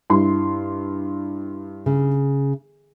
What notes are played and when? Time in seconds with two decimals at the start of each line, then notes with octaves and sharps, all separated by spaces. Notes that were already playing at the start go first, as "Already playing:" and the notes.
0.10 G2 E4 C6
1.86 C#3